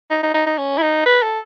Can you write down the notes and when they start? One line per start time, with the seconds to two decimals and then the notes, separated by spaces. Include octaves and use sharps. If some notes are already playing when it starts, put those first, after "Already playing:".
0.11 D#4
0.23 D#4
0.35 D#4
0.47 D#4
0.58 C#4
0.78 E4
0.82 D#4
1.06 B4
1.22 A4